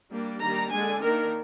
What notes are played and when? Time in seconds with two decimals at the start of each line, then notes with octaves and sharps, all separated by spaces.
0.11 G3 A#3 D4
0.41 D#3 G3 A#3 D4 A#5
0.71 D3 G#3 D4 G#5
1.02 D#3 A#3 D4 A#4